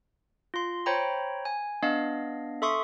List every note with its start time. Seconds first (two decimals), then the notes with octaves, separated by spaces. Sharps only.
0.54 F4 C6
0.86 C5 C#5 G5 A#5 B5
1.45 G#5
1.83 B3 D4 D#5 F5
2.62 A4 E5 C6 C#6 D#6